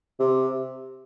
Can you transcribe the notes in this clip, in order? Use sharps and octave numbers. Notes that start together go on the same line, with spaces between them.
C3